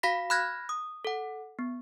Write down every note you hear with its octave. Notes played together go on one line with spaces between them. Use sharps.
F#4 F5 B5 A#6 B6
B5 F6 F#6 G#6 A#6
D#6
A4 F#5
B3